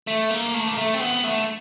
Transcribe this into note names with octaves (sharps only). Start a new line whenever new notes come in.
A3
A#3
A3
A#3
A3
C4
B3
A3